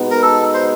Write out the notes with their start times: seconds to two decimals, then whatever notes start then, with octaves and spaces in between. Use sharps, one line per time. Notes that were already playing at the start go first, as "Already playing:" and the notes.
Already playing: B2 G#3 B3 D#4
0.11 A#4
0.22 A4
0.54 C5